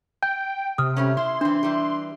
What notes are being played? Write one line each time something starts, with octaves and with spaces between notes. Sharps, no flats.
G5 G6
C3 D#6 F6
G3 A3 C#4
E4 C6
E3 C4 D4
E3 G3